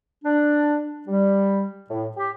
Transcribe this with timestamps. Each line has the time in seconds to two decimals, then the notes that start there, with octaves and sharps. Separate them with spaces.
0.25 D4
1.07 G3
1.90 A2
2.16 G4